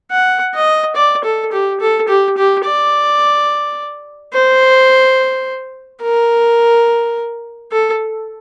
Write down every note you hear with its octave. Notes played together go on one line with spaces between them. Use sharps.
F#5
D#5
D5
A4
G4
A4
G4
G4
D5
C5
A#4
A4